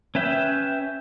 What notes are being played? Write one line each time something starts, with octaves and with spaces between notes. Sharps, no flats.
C#4 B4 E5 G5